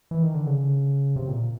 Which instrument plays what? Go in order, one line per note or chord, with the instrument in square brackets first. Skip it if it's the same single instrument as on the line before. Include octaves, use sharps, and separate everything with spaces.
[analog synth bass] E3
D#3
D3
C#3
C3
A#2